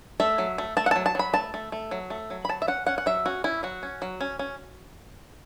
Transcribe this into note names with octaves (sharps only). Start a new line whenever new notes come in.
A3 E5
F#3
A3
A3 A5
F#5
F#3 A5
A5
F#3 B5
A3 A5
A3
A3
F#3
A3
F#3
B5
F#3 A5
E5
C#4 F#5
C#4 F#5
F#5
F#3 E5
C#4 F#4
C#4 E4
F#3 F#4
C#4
F#3
C#4
C#4